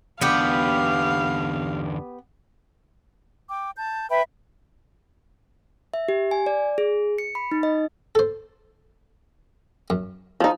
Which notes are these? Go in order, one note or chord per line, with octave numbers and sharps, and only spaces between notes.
E2 D3 B3 D4 G4 F5
G5 D6
A5 G6
B4 E5 G5 B5
E5
G4
G#5
D5
G#4
C#7
B5
D#4
D#5
A4 C5
F#2
F3 D#4